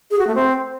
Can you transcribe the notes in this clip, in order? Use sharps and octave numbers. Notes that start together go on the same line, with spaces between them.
G#4
F#4
A3
C4